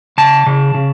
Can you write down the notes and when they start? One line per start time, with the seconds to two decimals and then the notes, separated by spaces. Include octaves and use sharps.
0.18 C#3 A5
0.46 C#3
0.74 C#3